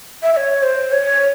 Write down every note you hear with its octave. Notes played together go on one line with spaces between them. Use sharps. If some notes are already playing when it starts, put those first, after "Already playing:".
E5
E5
C#5
C5
C#5